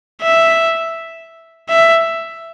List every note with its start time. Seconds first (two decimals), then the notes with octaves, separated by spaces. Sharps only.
0.22 E5
1.70 E5